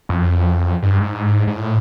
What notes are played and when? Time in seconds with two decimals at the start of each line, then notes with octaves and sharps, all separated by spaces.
0.09 F2
0.83 G2
1.01 G#2
1.47 G#2
1.56 A2